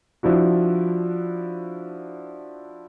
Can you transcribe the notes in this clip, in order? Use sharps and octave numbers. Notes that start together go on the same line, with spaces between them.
F3 D4 E4 F#4